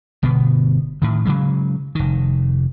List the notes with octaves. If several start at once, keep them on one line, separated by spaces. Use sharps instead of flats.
G1 B2 B3
A2 D#3
C#3 F#3 G#3
F1 D#3